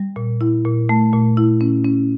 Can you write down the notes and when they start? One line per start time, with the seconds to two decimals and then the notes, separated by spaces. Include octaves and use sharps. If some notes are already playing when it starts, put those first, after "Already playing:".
Already playing: G3
0.16 A#2
0.41 E4
0.65 A#2
0.89 A3
1.13 A#2
1.37 E4
1.61 C#4
1.85 C#4